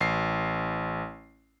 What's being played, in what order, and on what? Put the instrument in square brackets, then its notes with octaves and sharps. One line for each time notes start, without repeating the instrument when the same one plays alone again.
[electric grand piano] A1 C7